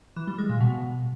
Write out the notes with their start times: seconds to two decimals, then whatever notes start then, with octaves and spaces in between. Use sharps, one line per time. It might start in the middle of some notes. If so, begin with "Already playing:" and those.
0.16 E3
0.27 G3
0.38 G#3
0.49 A#2
0.60 B2